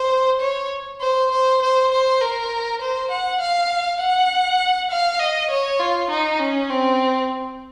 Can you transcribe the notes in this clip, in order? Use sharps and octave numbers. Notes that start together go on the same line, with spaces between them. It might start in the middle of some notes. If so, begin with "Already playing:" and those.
Already playing: C5
C#5
C5
C5
C5
C5
A#4
C5
F#5
F5
F#5
F5
D#5
C#5
F4
D#4
C#4
C4